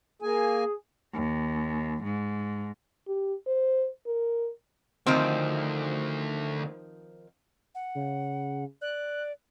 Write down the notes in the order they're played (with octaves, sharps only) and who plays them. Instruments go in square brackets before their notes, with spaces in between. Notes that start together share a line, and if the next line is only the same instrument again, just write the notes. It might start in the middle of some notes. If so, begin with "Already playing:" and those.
[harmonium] A#3 G#5 [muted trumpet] G#4
[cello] D#2
G#2
[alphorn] G4
C5
A#4
[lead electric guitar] D2 [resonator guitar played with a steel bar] D#3 F3 C4
[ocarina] F#5
[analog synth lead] C#3
[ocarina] D5 [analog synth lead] F#6